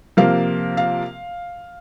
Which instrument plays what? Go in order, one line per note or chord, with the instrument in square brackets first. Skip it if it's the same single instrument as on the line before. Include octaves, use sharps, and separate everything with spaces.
[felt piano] C3 F3 A#3 F5
F5